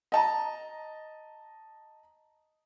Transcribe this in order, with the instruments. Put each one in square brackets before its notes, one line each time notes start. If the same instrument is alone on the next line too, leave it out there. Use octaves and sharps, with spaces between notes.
[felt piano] D#5 A5 A#5